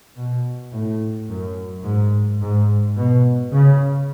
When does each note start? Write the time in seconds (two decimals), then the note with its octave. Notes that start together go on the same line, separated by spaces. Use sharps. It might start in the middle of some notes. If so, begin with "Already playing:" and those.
0.17 B2
0.73 A2
1.28 F#2
1.84 G#2
2.40 G#2
2.96 B2
3.51 C#3